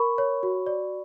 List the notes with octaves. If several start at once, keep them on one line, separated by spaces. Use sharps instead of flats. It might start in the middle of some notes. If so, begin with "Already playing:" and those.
Already playing: A#4 B5 C#6
C#5
F#4
D5